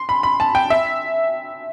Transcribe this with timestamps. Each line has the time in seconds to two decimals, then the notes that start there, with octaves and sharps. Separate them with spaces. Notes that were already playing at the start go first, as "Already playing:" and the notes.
Already playing: C6
0.09 B5
0.23 B5
0.40 A5
0.55 G5
0.70 E5